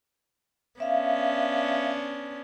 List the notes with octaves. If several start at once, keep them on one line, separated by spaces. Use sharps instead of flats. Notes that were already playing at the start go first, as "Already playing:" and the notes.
B3 C#4 D4 E5 F5